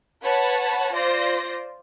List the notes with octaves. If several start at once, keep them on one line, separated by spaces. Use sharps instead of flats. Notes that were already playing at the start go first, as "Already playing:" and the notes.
B4 C#5 F#5 A5
F4 C5 D5 A#6